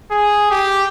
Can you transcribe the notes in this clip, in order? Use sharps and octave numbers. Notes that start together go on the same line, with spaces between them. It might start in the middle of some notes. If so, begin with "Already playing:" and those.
G#4
G4